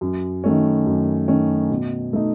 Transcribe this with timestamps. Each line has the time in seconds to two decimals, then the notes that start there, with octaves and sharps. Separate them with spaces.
0.01 F#2
0.44 D#3 A3 C#4
0.86 F#2
1.28 D#3 A3 C#4
1.70 B2
2.13 A3 D#4